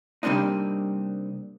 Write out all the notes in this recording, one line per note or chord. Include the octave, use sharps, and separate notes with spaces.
C3 G3 A#3 C4 D4 D#4